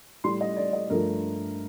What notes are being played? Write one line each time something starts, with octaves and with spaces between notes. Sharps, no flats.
A2 G3 C6
D#5
D5
D#5
G2 F3 A3 A#4